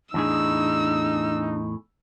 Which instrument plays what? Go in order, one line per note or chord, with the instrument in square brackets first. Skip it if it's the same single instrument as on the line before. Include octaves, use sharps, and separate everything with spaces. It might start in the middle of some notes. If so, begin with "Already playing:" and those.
[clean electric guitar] E2 A2 G#4 [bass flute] D4 [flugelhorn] D#4 [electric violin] E6